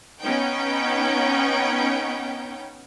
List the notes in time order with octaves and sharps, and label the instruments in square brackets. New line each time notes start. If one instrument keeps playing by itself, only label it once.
[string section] B3 C#4 D#4 G5